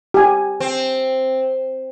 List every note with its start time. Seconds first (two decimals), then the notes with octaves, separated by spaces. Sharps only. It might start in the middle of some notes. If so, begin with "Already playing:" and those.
0.14 G4 G#5
0.60 C4